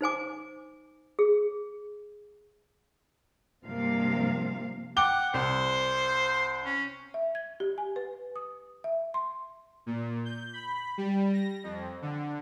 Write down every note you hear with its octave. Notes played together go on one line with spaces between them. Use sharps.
D#4 C5 G#5 D6
G#4
G2 C3 F3 A#3 F5
F#5 G5 D6 G7
C2 C5
C#4
E5
G#6
G4
G#5
B4
D#6
E5
C6
A#2
G6
B5
G3
A#6
F2
D3